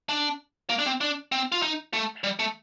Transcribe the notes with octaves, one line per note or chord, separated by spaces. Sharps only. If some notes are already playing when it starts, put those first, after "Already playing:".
D4
A#3
D4
C4
D4
C4
F4
D#4
A3
G3
A3